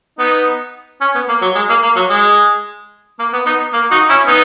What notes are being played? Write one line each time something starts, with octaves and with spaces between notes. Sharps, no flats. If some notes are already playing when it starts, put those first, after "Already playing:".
B3 D#4
C#4
B3
A#3
F#3
G#3
A#3
A#3
F#3
G#3
A#3
B3
B3 D#4
A#3
D#4 F#4
C#4 E4
B3 D#4